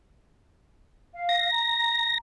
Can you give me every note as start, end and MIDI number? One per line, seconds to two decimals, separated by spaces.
1.14 1.49 77
1.29 2.18 94
1.51 2.14 82